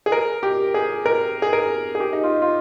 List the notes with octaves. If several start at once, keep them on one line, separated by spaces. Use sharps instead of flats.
G#4
A#4
G4
G#4
A#4
G#4
A#4
G#4
G4
D#4
F4
F4